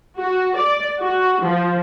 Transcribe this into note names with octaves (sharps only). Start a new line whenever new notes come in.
F#4
D5
F#4
F3